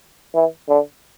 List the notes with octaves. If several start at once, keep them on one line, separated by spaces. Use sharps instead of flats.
E3
D3